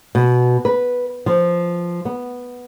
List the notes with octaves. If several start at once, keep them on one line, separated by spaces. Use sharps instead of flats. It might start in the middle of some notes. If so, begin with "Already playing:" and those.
B2
B4
F3
B3